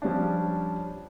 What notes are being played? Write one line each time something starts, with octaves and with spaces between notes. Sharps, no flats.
F3 G3 C#4 D4